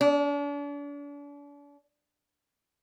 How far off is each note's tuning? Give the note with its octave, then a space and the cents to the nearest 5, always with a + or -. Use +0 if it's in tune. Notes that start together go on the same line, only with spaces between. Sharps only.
D4 -40